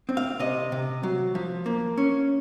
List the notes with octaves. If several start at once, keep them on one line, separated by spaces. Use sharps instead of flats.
C4
F5
C3 D#5
C3
F#3
F3
A#3
C#4